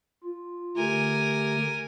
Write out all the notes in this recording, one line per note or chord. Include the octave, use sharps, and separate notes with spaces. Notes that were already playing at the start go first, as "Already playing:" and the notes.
F4
D3 A3 G4 A#4 G#5